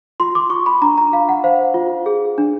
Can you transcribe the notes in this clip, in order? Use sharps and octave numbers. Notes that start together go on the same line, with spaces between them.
F4 C6
D6
F4 C#6
B5
D4 A#5
A#5
F4 F5
F#5
C5 F5
F4
G#4
D4